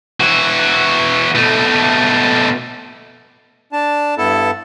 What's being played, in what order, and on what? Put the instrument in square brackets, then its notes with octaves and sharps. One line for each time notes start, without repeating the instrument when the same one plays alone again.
[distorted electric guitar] E3 F#4
B2 A3
[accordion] D4 A5
G2 B3 E4 A4 A5